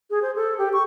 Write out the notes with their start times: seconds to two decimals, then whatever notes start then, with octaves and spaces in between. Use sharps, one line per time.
0.10 G#4
0.22 C5
0.36 A4
0.58 G4
0.73 C#6